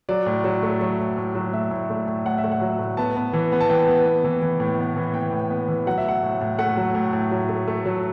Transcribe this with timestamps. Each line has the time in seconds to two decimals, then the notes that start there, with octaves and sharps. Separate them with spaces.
0.09 F#3 D5
0.26 A2
0.44 F#3
0.63 A3
0.81 F#3
0.99 A2
1.17 A2
1.35 F#3
1.53 A2 E5
1.71 A2
1.90 A3
2.07 A2
2.25 A2 F#5
2.38 E5
2.44 A3
2.52 F#5
2.61 F#3
2.79 A2
2.97 B3 A5
3.16 B3
3.33 E3
3.52 B3
3.61 A5
3.70 E3 G5
3.88 B3
4.06 B3
4.24 E3
4.42 E3
4.60 A2
4.79 B3
4.97 E3
5.14 B3 G5
5.33 A2
5.50 B3
5.68 E3
5.87 F#3 F#5
5.98 E5
6.05 A2 F#5
6.23 A2
6.41 A2
6.59 A3 F#5
6.77 F#3
6.95 A2
7.13 A2
7.31 F#3
7.49 A3
7.68 A3
7.86 F#3